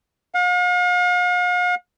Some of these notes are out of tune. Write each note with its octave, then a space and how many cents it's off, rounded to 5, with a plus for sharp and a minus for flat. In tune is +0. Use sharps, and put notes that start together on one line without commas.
F5 +45